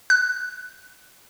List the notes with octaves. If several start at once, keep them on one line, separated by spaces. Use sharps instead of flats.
F#6